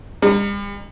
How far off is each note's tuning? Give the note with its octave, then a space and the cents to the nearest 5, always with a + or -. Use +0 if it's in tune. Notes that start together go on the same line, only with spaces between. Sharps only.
G3 +45 A#5 +0